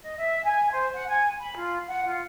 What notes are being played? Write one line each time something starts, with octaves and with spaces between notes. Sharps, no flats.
D#5
E5
G#5
C5
F#5
G#5
B5
F4
F#5
F4